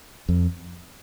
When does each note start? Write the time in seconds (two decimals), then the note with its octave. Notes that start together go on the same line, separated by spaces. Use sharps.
0.29 F2